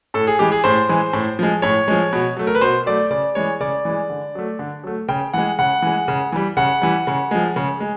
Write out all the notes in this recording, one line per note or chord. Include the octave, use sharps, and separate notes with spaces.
A2 A4
G#4
E3 G#3 G4
G#4
A2 C5
E3 G#3
A2
F3 G#3
A2 C#5
F3 G#3
B2
F#3 A3
A#4
B4
B2 C5
F#3 A3 D5
C#3 D5
E3 G#3 C#5
C#3 D5
E3 G#3
D3
F#3 A3
D3
F#3 A3
C#3 G5
E3 G#3 F#5
C#3 F#5
E3 G#3
C#3
E3 G3
C#3 F#5
E3 G3
C#3
F3 G#3
C#3
G#3